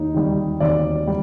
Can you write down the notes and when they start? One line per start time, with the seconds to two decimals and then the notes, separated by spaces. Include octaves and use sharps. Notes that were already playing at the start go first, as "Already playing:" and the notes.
Already playing: D#2 D#4
0.14 D#3 G3
0.60 D#2 D5
1.07 G3